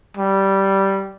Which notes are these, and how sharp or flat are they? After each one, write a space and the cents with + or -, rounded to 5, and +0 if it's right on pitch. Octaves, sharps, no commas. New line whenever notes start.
G3 -10